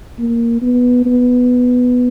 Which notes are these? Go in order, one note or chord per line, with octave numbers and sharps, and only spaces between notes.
A#3
B3
B3